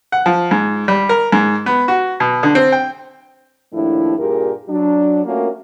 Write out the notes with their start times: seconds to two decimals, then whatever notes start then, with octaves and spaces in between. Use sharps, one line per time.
0.12 F#5
0.26 F3
0.51 G#2
0.88 G3
1.09 A#4
1.32 G#2
1.66 B3
1.88 F#4
2.20 B2
2.43 D3
2.55 C4
2.72 G5
3.72 D#2 A2 F3 D4 E4
4.18 G2 A#2 G4 G#4 A#4
4.69 F#3 D4
5.24 A3 A#3 C#4 F4 F#4 A#4